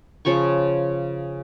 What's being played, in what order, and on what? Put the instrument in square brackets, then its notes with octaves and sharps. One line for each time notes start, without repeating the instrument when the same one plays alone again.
[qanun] C#3 F3 C#5 C#6